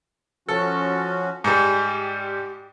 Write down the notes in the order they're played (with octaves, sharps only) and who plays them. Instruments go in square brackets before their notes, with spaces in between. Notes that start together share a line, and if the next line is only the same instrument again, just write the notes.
[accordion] F3 C#4 F#4 [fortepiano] A4
[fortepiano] G#2 G3 [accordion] G4